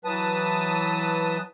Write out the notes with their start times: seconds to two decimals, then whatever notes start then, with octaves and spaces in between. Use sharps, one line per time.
0.05 E3 F#3 B4 A5 D#6